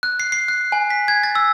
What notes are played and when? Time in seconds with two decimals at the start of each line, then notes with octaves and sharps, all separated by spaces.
0.03 F#6
0.20 C7
0.32 C7
0.48 F#6
0.72 G#5
0.90 B6
1.08 G#6
1.23 A6
1.35 E6